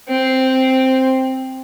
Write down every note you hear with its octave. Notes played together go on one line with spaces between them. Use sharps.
C4